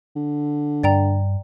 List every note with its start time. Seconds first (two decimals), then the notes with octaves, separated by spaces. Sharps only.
0.16 D3
0.83 G2 D5 G5 A#5